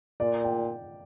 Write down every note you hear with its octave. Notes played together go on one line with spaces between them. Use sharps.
A#2 D5
G5